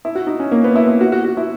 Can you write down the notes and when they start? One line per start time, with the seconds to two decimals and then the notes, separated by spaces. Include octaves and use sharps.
0.05 E4
0.15 F#4
0.27 D#4
0.40 C#4
0.52 A#3
0.64 B3
0.76 E4
0.87 E4
1.01 F#4
1.12 F#4
1.24 F#4
1.37 E4